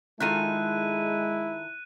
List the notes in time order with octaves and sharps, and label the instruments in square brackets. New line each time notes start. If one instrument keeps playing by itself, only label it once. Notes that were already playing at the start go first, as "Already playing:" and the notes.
[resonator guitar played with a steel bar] D#3 F4 A4 [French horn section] G#3 [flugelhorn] E4 [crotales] F#6 D#7